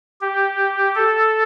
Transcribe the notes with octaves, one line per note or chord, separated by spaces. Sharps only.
G4
A4